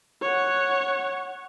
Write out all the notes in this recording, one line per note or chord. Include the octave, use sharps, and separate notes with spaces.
C#5 F#5